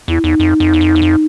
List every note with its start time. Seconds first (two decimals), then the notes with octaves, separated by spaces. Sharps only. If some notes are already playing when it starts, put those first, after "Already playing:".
0.08 E2 E4
0.24 E2 D#4
0.40 F2
0.60 F2
0.73 E2
0.81 F2
0.95 E2
1.02 F2